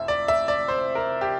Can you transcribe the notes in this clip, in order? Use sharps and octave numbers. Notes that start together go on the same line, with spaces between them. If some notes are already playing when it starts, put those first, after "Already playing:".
Already playing: F1 F2 E5
D5
E5
D5
C5
A#4
G4